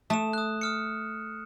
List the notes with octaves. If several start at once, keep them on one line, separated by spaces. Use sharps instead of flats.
A3 D#6 E7
D#6 F#6
D#6 F6 C#7